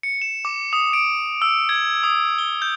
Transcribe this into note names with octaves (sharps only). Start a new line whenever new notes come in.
C#7
E7
D6
D#6
D7
E6
G#6
D#6
G7
G6